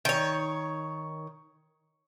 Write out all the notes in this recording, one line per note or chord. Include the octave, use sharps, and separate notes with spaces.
D#3 C#5